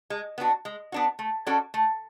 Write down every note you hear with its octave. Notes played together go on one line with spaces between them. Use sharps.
G#3
B3 D4 F#4
G#3
B3 D4 F#4
A3
C#4 F#4 A4 D5
A3